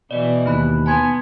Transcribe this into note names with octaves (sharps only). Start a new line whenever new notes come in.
B2 E3 D5 D#5
D#2 E4 B5 F#6
B3 G#5 A5 C6